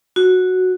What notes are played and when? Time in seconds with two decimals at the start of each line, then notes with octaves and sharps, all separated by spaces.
0.16 F#4